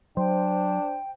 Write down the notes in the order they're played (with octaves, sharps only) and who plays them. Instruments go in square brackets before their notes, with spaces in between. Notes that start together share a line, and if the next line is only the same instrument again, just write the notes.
[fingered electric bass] F#3 [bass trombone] D4 [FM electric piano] C5 [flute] G5